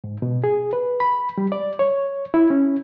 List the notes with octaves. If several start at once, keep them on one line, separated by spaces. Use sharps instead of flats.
G#2
B2
G#4
B4
B5
G3
D5
C#5
E4
C#4